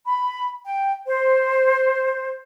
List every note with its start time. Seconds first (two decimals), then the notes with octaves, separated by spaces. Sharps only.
0.05 B5
0.64 G5
1.06 C5